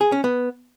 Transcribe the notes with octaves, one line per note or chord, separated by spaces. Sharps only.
G#4
C#4
B3